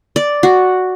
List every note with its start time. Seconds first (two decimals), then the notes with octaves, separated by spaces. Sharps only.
0.16 D5
0.43 F#4